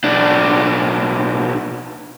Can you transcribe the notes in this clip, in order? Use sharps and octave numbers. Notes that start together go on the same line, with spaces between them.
B1 D4